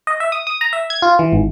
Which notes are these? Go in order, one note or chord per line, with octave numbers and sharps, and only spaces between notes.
D#5
E5
D#6
D#6
A#5
E5
G#6
F4
E3
G#1